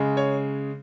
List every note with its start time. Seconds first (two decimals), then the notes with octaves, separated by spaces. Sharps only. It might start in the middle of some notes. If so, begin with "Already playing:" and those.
Already playing: C#3 G#3
0.17 C#5